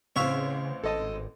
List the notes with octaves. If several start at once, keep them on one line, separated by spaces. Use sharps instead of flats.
A1 C#3 C4 C#5 E5 F5
G#1 A4 D#5 A5